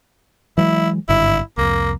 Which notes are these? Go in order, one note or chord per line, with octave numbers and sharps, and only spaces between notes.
E3 F#3 G#3 E4
G#1 G2 D3 E4
C2 F2 A#3